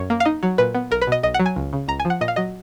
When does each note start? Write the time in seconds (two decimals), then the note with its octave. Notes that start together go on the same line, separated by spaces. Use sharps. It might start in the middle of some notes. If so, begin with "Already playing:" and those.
Already playing: F#2 C#5
0.10 A#3
0.20 F5
0.25 D#4 D#5
0.43 F#3
0.58 A#2 B4
0.75 B3
0.91 B1 A#4
1.02 B4
1.07 B2 D#5
1.23 B1 D#5
1.34 F#5
1.40 F#3
1.46 G#5
1.56 C#2
1.73 C#3
1.88 C#2 A#5
2.00 G#5
2.05 F3
2.10 F#5
2.21 A#2 D#5
2.28 F5
2.36 F#3 D#5